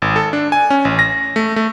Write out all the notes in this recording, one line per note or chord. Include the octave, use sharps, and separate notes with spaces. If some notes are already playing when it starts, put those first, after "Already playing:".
G#1
A4
D4
G#5
C#4
A1
A#6
A3
A3